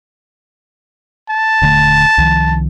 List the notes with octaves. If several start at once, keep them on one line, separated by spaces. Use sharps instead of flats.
A5
D#1 D3 A3
C2 D#3 F3